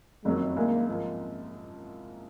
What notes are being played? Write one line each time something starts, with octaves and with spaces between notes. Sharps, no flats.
F#1 F2 D#3 F#3 G#3
C2 C3 D#3 G#3 A#3
G#2 F3 A#3